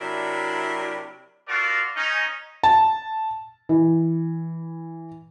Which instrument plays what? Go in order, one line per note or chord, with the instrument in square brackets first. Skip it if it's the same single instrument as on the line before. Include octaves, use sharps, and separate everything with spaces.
[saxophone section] C3 F#3 D4 E4 A#4 D5
[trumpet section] F4 F#4 A4 A#4 D5
C#4 D#4
[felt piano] A5
E3